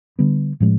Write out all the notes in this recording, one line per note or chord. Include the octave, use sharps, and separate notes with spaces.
D3 G3 B3
A2 F3 G#3 C#4